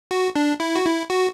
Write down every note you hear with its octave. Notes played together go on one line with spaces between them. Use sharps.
F#4
D4
E4
F#4
E4
F#4